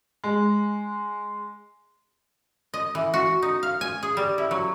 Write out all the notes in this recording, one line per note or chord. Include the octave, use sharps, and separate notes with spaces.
G#3
D#5
E3
F#4
D#4
F5
G#5
G#4
G3
E4
F#3